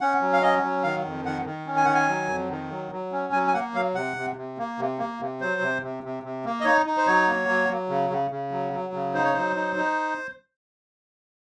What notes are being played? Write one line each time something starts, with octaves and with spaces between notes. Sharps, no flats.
C#4 F#5
F#3
F5
C#4 D#5
F#3
D#3 F5
F2
D#3 F#5
D#3
C#4
G#5
D#3 F#5
G#5
F#3
F2
D#3
F#3
F#3
C#4
F#3 G#5
G#5
A#3 F#5
F#3 F5
C3 F#5
C3
C3
A#3
C3
A#3
C3
F#3 C5
C3
C3
C3
C3
A#3
D#5
D#4 C#5
D#4
C5
F#3 C#5
A#3
F#3
F#3
C#3
C#3
C#3
F#3
F#3
C#3
D#4 C5
C#5
F#3 C5
D#4
D#4